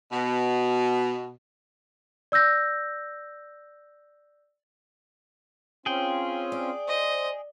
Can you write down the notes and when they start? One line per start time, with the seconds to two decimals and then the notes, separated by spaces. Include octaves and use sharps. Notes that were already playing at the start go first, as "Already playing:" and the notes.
0.11 B2
2.32 D5 E6 G6 A#6
5.86 C4 C#4 F4 G#4 G5
6.52 D5
6.88 C5 D#5